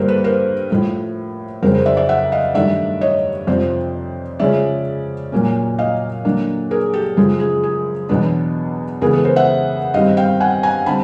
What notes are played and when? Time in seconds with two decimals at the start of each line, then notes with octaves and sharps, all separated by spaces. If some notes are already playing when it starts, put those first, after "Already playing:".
Already playing: G2 D3 G3 A#3 D4 A#4 C5
0.08 A4 B4
0.24 A#4 C5
0.70 A2 F3 A3
1.63 F2 C#3 F#3 A#4 C5
1.74 A#4 C5
1.86 D5 E5
1.97 D5 E5
2.09 E5 F#5
2.32 D#5 F5
2.54 G2 D#3 F#3 A3 D4 D5 E5
3.01 C#5 D#5
3.47 F2 C3 F3 C5 D5
4.40 C#3 F3 G#3 C#4 D5 E5
5.32 A#2 F#3 A#3 C#4
5.79 D#5 F5
6.25 D3 F#3 A#3 D4
6.71 G#4 A#4
6.93 G4 A4
7.17 F#2 C#3 F3 G#3 G#4
7.40 G#4
7.63 G#4
8.09 E2 B2 F#3 B3 D4
9.01 C#3 E3 G#3 B3 G#4 A#4
9.13 A4 B4
9.25 A#4 C5
9.36 E5 F#5
9.94 G2 D#3 G3 C4 D#5 F5
10.17 F5 G5
10.40 F#5 G#5
10.63 G#5 A#5
10.86 D3 G3 C4 A5 B5